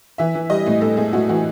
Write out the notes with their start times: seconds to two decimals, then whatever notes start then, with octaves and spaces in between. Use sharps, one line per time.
0.18 E3 E5
0.35 E3
0.50 G3 D#5
0.66 A2
0.81 A2 A4
0.97 A2 G#4
1.13 A2 F#4
1.29 E3 F#4